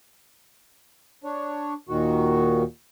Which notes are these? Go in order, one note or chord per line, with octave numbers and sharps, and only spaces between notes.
D4 C#5
D#2 A#2 D#3 F#4